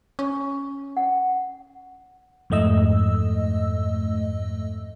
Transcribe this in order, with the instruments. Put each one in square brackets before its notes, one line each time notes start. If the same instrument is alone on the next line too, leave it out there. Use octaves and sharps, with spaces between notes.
[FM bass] C#4 [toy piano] C#6
[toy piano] F#5
[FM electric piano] F2 G#2 A3 D#5 E6